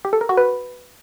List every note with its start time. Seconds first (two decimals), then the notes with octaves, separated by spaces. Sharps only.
0.05 G4
0.13 A4
0.21 A#4
0.29 F#4
0.37 B4